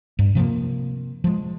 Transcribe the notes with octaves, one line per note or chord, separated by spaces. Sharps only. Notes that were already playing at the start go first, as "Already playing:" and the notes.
G2
C3 F3 F#3 A#3
F3 G#3